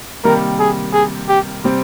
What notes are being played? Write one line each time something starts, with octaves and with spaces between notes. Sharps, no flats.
C3 D#3 G3 A#3 A#4
G#4
G#4
G4
C3 G3 C4